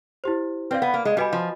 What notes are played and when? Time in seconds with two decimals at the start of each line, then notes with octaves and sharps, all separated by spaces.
0.24 E4 G4 C5
0.71 C4 B4 D5 F5
0.82 B3
0.94 A#3
1.05 G#3
1.17 G3 F#4 B4 D#5 G#5 B5
1.33 F3